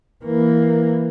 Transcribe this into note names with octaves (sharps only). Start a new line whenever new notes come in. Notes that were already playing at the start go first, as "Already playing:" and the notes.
E3 A#3